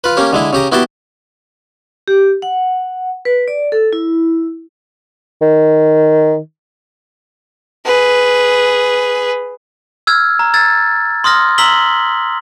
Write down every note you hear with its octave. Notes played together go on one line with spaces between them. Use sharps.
F4 B4
A#3 C#4 G4
D3 G#3 E4
C#3 G4 A#5
B3 E4 F#4 G4 G5 A5
G4
F#5
B4
D5
A4
E4
D#3
G#4 B4
E6 F6 G#6
A#5
E6 G#6 A6
C6 D#6 F6 A#6
A#5 C6 E6 B6 F#7 G7